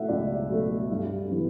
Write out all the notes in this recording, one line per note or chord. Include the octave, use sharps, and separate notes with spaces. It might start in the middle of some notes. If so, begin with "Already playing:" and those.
Already playing: B2 A3 E5 F#5
C#2 D5
B2 A3
G2
E3 B3